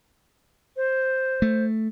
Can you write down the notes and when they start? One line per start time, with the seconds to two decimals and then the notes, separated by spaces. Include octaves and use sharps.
0.77 C5
1.42 A3